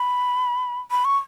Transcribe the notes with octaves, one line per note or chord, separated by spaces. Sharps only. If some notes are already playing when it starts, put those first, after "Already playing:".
Already playing: B5
B5
C#6